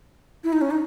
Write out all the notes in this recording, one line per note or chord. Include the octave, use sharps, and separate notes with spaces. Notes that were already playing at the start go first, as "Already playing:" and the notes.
E4
D#4
C#4
D#4